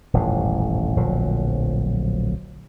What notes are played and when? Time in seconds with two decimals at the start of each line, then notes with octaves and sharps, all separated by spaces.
0.13 D#1 A1 F2 G#2
0.96 D1 A#1 F3 F#3